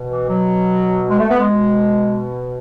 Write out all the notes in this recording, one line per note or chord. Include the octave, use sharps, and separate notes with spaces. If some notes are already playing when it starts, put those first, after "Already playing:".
Already playing: B2
E3
F#3
G#3
A3
B3
G#3
B2